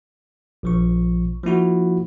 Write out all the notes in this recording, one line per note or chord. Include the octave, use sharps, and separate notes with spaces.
A#1 F3 C#6
F3 A#3 E4 F#4